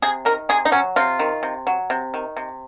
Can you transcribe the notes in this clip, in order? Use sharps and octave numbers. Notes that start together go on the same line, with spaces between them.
C3 G#4
D#3 A#4
C3 G#4
D#4
F#3 C#4
C3 F4
D#3
C3
F#3
C3
D#3
C3